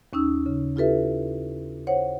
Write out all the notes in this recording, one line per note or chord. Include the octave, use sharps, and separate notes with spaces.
D#2 C#4 D#4 E6
C#3
E4 F4 G4 A4 B4 E5
C5 C#5 F#5